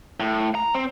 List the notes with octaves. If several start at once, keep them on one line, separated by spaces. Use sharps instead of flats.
A2
A#5
C4